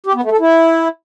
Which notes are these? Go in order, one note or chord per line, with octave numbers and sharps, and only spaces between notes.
G4
B3
A3
A4
E4